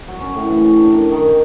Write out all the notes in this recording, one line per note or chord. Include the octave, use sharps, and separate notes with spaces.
F#3
C#4
A2
E3
C#4
D4
A#4
D#3
G4